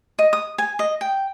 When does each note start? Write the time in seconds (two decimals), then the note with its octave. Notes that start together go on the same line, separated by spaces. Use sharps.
0.19 D#5
0.33 D#6
0.58 G#5
0.79 D#5
1.01 G5